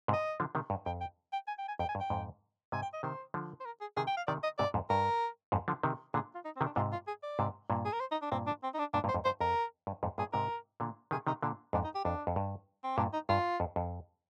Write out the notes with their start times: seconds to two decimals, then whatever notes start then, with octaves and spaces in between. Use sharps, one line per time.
0.08 G#2 C3
0.13 D#5
0.40 D3 F3
0.55 C3 D#3
0.70 G2
0.86 F2 G5
1.01 G5
1.33 G5
1.48 G#5
1.59 G5
1.68 G#5
1.79 F2 G5
1.89 G#5
1.95 G2
2.01 G5
2.10 F2 G#2
2.72 G#2 C3 G#5
2.82 G5
2.94 D#5
3.03 C3 D#3 C5
3.34 D3 F3
3.60 C5
3.66 A#4
3.81 G#4
3.97 C3 D#3 G#4
4.07 G5
4.17 F5
4.27 C3 D#3 D5
4.43 D#5
4.58 G#2 C3 D5
4.74 F2 G#2
4.90 G2 A#4
5.52 F2 G#2
5.68 D3 F3
5.83 C3 D#3
6.14 A#2 D3 G#4
6.35 F4
6.45 D#4
6.56 C4
6.61 C3 D#3
6.66 D4
6.76 G#2 C3 F4
6.92 F4
7.08 G#4
7.23 D5
7.39 G#2 C3
7.70 G2 A#2
7.85 G#4
7.93 A#4
8.00 C5
8.12 D#4
8.22 D4
8.32 G2 A#2 C4
8.47 D4
8.64 C4
8.74 D#4
8.79 D4
8.94 G2 A#2 D4
9.04 G2 A#2
9.09 C5
9.14 F2 G#2
9.25 G2 C5
9.41 F2 A#4
9.87 G2
10.03 F2 G#2
10.18 G2 A#2 G#4
10.33 G#2 C3 A#4
10.80 A#2 D3
11.11 C3 D#3 G#4
11.27 C3 D#3 D#4
11.43 A#2 D3 D4
11.73 F2 G#2 D4
11.84 D#4
11.95 G4
12.05 F2 D4
12.27 F2
12.36 G2
12.84 C4
12.98 G2 A#2 D4
13.13 D#4
13.29 G2 F4
13.60 F2
13.76 F2